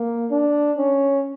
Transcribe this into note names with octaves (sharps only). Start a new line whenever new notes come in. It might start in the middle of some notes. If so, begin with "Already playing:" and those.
Already playing: A#3
D4
C#4